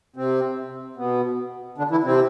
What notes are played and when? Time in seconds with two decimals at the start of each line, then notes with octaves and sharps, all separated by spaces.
0.16 C3 C4
0.97 B2 B3
1.78 D3 D4
1.91 E3 E4
2.04 C3 C4